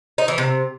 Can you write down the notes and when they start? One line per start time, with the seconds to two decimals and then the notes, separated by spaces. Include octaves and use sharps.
0.18 D#4
0.28 E3
0.38 C3